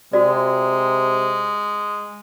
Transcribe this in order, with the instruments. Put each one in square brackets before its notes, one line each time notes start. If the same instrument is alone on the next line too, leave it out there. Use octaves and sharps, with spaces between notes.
[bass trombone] C3 [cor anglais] G#3 [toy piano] F#4 D5